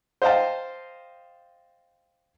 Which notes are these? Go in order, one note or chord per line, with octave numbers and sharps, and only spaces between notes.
C5 D#5 F5 G5 A5